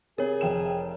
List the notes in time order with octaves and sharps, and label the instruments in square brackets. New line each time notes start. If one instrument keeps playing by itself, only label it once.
[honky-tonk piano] C3 [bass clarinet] G#4 [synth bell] A#4 C#5
[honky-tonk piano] F1 G5 E7